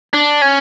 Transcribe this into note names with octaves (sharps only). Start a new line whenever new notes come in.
D4
C#4